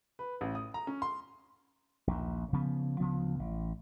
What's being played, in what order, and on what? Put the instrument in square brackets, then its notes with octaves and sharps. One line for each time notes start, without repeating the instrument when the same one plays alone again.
[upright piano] B4
A1
D#6
A#5
C#4
C6
[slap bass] A#1 D#2
C#3 F3 B3
D2 C#3 F3 B3
A1